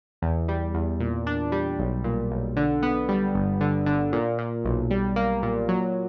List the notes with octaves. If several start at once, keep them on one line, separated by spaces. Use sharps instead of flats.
E2
G3
E2
A#2
D4
G3
B1
A#2
B1
D3
B3
G3
G1
D3
D3
A#2
A#2
B1
G3
A#3
A#2
F#3